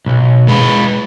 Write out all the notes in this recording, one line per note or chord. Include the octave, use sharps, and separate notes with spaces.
B1
G#3 B4